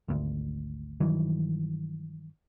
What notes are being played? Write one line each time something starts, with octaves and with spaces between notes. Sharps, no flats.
G#1 D2
G2 D#3 E3 F#3